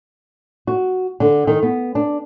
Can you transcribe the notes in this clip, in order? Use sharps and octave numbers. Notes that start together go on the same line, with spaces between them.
F#4
D3
D#3
B3
D4